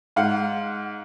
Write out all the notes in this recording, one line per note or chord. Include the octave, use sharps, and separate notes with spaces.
G#2 F5 F#5